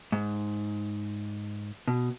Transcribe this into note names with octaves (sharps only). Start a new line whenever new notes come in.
G#2
B2